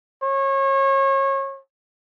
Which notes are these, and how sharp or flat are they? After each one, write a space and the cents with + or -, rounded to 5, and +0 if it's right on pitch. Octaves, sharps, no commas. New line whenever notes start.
C#5 -30